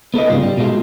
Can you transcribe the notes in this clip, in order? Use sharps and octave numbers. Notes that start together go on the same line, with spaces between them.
B3 A4 B4 D#5
G#2 C#3 G3 F4
G3
B2 G#3 A3 F4